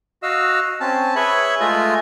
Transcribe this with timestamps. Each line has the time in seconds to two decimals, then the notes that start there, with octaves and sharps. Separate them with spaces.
0.23 F#4 D#5 F5 E6
0.80 C4 C#4 A5
1.16 G#4 B4 C#5 E5 B5
1.60 G#3 A3 F4 D#5 E5